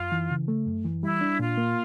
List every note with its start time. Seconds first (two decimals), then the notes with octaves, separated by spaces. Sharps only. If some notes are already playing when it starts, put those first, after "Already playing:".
Already playing: F#2 F4
0.12 E3
0.30 C#3
0.48 A3
0.67 F#2
0.85 E3
1.03 G3 E4
1.21 D4
1.39 A#2 F4
1.57 A#3